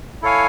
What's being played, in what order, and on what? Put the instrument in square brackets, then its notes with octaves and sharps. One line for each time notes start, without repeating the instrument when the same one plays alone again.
[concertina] E4 A4 C#5 F5 G#5